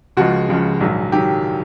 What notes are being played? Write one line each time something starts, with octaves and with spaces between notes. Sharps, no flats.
C#2 C#3 F3 G#3 F#4
C#2 C#3 F3 G#3
A#1 G#2 D#3 F#3
D#3 F#3 G4